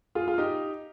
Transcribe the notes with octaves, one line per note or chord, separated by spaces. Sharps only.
F4 G#4
F4
D#4 G4